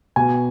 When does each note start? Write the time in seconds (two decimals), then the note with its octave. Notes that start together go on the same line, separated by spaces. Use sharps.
0.16 B2 G#5